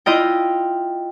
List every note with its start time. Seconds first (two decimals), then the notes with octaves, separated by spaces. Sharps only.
0.06 E4 F4 D#5 G5